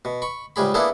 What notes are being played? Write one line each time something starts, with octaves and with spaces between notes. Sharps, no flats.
B2
B5 C#6
C#2 G#2 G3 G#4 B5
A#3 B3 D4 E4 G#4 A4